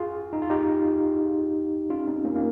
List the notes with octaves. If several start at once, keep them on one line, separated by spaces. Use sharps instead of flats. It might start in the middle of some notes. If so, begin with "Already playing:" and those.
Already playing: F4 G#4
D#4
F4
D#4 G4
C#4 F4
C4 D#4
A#3 C#4
A#3